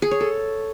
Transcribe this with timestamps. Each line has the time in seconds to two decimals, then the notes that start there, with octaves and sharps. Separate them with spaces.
0.02 G#4
0.11 C#5
0.20 A4